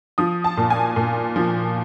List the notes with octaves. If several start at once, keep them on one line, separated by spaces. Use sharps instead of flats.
F3 D#6
A5
A#2
G#5
A#2
F3